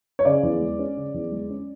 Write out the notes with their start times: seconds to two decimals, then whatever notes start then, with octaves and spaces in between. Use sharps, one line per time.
0.19 C#5
0.25 C#3 D5
0.43 E2
0.61 G#3
0.79 C#4
0.97 C#3
1.14 E2
1.32 G#3
1.50 C#4